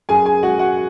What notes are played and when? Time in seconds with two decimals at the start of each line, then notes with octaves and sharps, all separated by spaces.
0.09 F#2 G#4 G#5
0.25 G#4 G#5
0.43 G#3 F#4 F#5
0.59 F#4 F#5